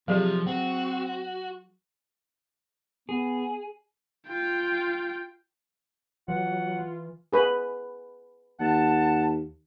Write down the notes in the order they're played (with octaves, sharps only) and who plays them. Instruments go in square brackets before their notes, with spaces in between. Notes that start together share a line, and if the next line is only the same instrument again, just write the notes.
[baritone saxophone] C3 [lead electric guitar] F3 [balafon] F#3 G#4 D5
[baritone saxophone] C4 [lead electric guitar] F#4
[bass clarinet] B3 [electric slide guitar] G#4
[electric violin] F4 G5
[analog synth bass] E3 [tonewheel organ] F#3 [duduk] F4 [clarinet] F#5
[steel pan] G#4 B4
[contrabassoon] D#2 [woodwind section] F#5 A5